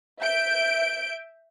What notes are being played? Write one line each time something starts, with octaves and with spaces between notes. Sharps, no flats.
E5 G6 D7